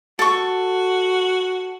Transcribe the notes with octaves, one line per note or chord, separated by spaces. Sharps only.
F#4 A4 C#6